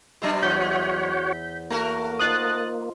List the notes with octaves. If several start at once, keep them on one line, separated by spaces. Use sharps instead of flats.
B2 F#3 D4 C5 E5 A#5
E2 F#4 C#5 G6 B6
A3 A#3 F#4 A#4 A#5
D#4 F4 C5 D#6 F#6 A6